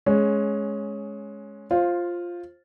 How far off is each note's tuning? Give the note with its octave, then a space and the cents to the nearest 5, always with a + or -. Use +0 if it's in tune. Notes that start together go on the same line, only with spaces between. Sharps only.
G#3 +15 C#4 +0
F4 +0 C5 +20